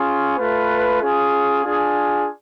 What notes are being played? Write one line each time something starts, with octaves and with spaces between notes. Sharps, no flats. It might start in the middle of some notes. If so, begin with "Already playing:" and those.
Already playing: C#4 F4 G#4
A3 F4 B4
C#4 F4 G#4
D4 F4 G#4